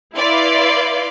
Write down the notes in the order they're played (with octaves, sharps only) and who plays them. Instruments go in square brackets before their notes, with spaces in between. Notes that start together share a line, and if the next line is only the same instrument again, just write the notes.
[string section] E4 B4 D5 F5 C6